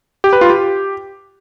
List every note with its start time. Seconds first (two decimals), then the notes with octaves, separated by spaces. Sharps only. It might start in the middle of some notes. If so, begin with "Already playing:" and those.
0.24 G4
0.33 B4
0.41 F4
0.50 G4